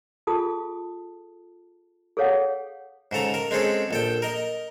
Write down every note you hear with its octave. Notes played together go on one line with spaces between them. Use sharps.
F4 G#4 A4 A5 D#6
G#4 A4 C#5 F5 F#5
G#2 C#3 A4 A#5
A#4
G#3 C4 C#4 G#4 A4
A#1 A4 G5
A#4 D#5